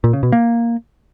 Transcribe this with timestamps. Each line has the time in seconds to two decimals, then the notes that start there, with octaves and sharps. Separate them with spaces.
0.04 A#2
0.13 C#3
0.23 B2
0.32 A#3